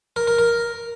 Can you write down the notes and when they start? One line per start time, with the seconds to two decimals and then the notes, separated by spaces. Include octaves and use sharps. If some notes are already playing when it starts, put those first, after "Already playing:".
0.16 A#4
0.27 A#4
0.39 A#4